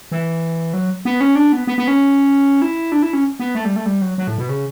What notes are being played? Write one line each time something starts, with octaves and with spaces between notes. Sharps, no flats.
E3
F#3
B3
C#4
D4
B3
B3
B3
C#4
E4
D4
E4
C#4
B3
A3
G3
A3
G3
F#3
F#3
A2
B2
C#3